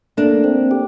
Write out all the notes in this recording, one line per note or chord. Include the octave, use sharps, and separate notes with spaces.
A3 A#3 D4
C4
G4